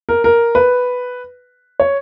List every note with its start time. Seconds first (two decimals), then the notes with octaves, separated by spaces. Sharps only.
0.09 A#4
0.24 A#4
0.55 B4
1.80 C#5